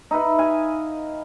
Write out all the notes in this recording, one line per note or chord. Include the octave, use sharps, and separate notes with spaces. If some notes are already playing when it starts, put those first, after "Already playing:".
D#4 E4 B4
F5 G#5